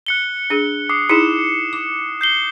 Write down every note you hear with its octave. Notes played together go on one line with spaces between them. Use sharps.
F#6 C#7 G7
D4 G#4
D6 D#6 C7
D#4 E4 G#4 C#7 E7
D6
G6 C7 G7